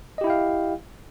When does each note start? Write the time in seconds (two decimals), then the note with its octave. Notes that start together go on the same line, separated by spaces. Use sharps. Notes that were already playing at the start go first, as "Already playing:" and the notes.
0.18 D#5
0.21 G4
0.24 E4
0.27 G5
0.30 F5